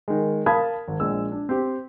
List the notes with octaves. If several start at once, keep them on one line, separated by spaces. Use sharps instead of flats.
D#3 G#3
A#4 F5 A5 B5 D#6 G#6
G#1
A#1 G#3 E6
D4
C4 G4